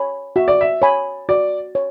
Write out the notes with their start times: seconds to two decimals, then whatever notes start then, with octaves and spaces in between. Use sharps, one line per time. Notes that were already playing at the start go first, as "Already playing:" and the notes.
Already playing: C#5 G#5 B5
0.36 F#4 E5
0.48 D5
0.61 E5
0.82 C#5 G#5 B5
1.29 F#4 D5
1.75 C#5